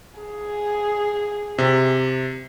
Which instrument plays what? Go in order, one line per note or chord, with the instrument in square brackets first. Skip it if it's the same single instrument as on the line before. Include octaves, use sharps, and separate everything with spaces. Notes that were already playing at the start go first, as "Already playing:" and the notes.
[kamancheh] G#4
[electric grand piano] C3